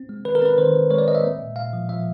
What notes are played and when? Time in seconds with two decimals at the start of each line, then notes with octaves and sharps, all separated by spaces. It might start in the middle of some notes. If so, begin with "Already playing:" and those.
Already playing: C4
0.09 G#3
0.25 D#3 B4
0.35 A#4
0.42 C4 B4
0.58 D#3 C5
0.74 D#3
0.91 G#3 C#5
0.98 D5
1.08 G#3 D#5
1.15 E5
1.23 A#3
1.40 A#2
1.56 A#2 F5
1.73 F3
1.89 F3 E5